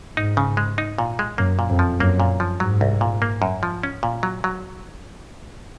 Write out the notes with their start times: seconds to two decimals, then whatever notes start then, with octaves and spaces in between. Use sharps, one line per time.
0.16 G#2 D#4
0.37 C#3
0.57 G#3
0.78 D#4
0.98 A#2
1.19 G#3
1.38 F#2 A#3
1.59 A#2
1.70 F2
1.79 F3
2.00 F#2 A#3
2.20 A#2
2.40 F3
2.60 G#2 F#3
2.81 C2
3.01 A#2
3.22 A#3
3.42 F#2
3.63 F3
3.83 C#4
4.03 A#2
4.23 F#3
4.44 F#3